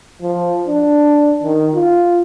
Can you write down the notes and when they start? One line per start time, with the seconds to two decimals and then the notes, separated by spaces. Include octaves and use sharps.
0.22 F3
0.68 D4
1.43 D#3
1.75 F4